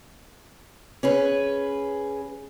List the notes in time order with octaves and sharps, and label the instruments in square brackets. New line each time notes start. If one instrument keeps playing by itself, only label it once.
[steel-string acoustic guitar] C#4 G#4 B4